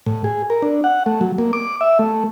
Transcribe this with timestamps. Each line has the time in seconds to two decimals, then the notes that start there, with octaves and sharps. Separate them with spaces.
0.06 A2
0.24 G#4
0.50 A#4
0.62 D4
0.84 F#5
1.06 A3
1.21 F#3
1.38 A#3
1.53 D6
1.81 E5
1.99 A3